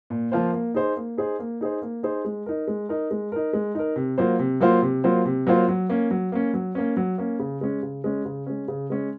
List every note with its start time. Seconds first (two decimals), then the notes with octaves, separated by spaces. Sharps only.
0.10 A#2
0.32 F3 A#3 F4 C5
0.53 A#3
0.74 D#4 G#4 C5
0.96 A#3
1.17 D#4 G#4 C5
1.39 A#3
1.61 D#4 G#4 C5
1.82 A#3
2.03 D#4 G#4 C5
2.25 G#3
2.46 D#4 A#4
2.67 G#3
2.89 D#4 A#4
3.11 G#3
3.32 D#4 A#4
3.53 G#3
3.75 D#4 A#4
3.96 C3
4.18 F#3 A#3 F4 C5
4.39 C3
4.60 F#3 A#3 F4 C5
4.82 C3
5.04 F#3 A#3 F4 C5
5.25 C3
5.47 F#3 A#3 F4 C5
5.68 F#3
5.89 A#3 C#4
6.11 F#3
6.32 A#3 C#4
6.54 F#3
6.75 A#3 C#4
6.97 F#3
7.18 A#3 C#4
7.39 C#3
7.61 G#3 C#4
7.83 C#3
8.04 G#3 C#4
8.25 C#3
8.46 G#3 C#4
8.68 C#3
8.90 G#3 C#4